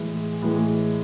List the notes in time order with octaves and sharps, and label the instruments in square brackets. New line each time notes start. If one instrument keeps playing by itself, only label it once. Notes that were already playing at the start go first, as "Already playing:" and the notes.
Already playing: [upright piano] A2 E3 G#3
A2 E3 G#3